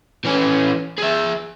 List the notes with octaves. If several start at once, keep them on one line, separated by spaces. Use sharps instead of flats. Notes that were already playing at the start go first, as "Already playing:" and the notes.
E3 C#4
G#4 E5